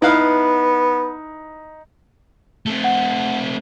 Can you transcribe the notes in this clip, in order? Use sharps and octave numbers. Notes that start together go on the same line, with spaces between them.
B3 D#4 E4 B4 F5
A3 C4
F#5